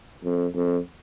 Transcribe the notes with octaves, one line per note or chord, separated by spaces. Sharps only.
F2
F2